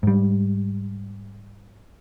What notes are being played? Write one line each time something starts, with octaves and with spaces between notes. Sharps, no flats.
G#2 G3